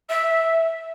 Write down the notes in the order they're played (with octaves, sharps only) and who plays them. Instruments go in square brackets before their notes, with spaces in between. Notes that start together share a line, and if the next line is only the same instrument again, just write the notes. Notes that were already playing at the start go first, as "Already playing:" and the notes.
[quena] E5